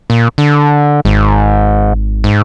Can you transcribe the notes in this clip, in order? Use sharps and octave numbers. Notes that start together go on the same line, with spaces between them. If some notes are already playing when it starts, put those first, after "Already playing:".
A#2
D3
G#1 G#2
G#2